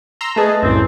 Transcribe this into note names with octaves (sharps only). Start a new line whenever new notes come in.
A#5 C6 E6
A3 G#4 B4 D#5 A5
C2 F#2 A2 E3 F#3 C4